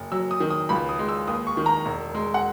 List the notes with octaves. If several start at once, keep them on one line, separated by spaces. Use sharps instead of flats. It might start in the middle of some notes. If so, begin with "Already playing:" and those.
Already playing: F#1
F#3 E6
D#6
D#3
D#6
C#2 B5
D#6
G#3
E6
D#2 D#6
C#6
D#3
A#5
E1
G#3
F#5